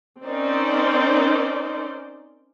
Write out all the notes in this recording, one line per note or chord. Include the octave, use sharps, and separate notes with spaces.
C4 C#4 D#4 A#4 C5 D5